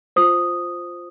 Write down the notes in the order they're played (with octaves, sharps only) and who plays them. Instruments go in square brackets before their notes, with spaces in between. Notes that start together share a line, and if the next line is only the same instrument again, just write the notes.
[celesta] F4 C5 D#6